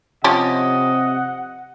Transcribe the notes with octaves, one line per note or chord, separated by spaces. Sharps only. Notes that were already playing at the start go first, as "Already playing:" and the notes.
C3 F3 C#4 G4 D#5 F#5